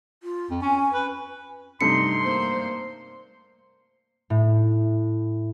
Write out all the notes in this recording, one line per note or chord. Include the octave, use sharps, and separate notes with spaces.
F4
F2
C#4 G#5
B4
G2 C3 A3 D#4 C6 C#7
A#3 C5
A2